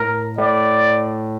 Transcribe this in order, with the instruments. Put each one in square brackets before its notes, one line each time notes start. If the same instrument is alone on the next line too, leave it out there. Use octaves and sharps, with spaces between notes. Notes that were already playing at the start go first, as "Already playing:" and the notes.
Already playing: [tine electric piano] A2 [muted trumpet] A#4
[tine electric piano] A2 [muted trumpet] D5